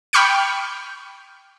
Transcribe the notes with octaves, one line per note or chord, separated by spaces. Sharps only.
G5 B5 C#6 F6 G6 C#7